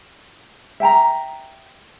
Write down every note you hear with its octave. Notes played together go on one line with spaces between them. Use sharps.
E5 G5 A5 A#5